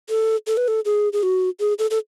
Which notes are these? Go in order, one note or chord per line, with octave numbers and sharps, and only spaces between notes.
A4
A4
B4
A4
G#4
G#4
F#4
G#4
A4
A4